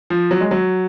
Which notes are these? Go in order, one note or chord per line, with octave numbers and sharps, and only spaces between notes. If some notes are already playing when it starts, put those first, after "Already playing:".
F3
F#3
G#3
F#3